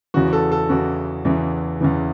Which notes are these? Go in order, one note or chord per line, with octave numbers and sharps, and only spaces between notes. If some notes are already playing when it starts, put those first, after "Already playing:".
E2 C#3 E3 F#4
A4
A4
E2 C#3 E3 F#4
E2 C#3 E3
E2 C#3 E3